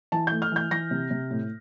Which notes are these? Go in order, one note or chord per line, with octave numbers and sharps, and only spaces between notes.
E3 A5
A3 G6
F6
E3 G6
E3 A#6
C3
C3
A2